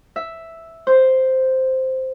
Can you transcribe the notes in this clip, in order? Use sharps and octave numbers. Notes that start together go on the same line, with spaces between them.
E5
C5